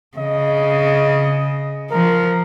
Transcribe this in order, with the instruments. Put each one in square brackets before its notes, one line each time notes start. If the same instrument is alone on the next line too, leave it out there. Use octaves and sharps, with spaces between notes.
[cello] C#3 [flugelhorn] D#5
[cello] F3 [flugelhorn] A#4